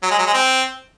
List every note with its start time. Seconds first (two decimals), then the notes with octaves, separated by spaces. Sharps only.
0.03 F#3
0.11 G#3
0.18 F#3
0.26 G#3
0.34 C4